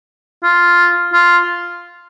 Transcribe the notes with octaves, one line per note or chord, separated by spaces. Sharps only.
F4
F4